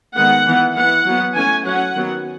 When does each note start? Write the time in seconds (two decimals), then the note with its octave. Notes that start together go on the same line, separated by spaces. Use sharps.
0.16 D#3 G#3 B3 F#5
0.46 E3 B3
0.76 E3 B3 F#5
1.06 F#3 B3
1.35 E3 A3 C#4 G#5
1.65 F#3 C#4 F#5
1.95 D#3 F#3 B3